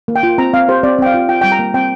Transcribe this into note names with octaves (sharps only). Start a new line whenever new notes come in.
A#3
G5
F4
C4 A#5
C4 F5
G4 C5
C4 D5
C4 G5
F5
F4
F4 G5
G3 G5
A#5
A#3
C4 G5